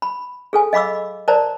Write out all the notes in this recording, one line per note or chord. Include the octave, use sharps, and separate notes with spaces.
B5
G#4 A4 G#5
D#5 F5 B5 D6 E6
A#4 C5 D5 A5 A#5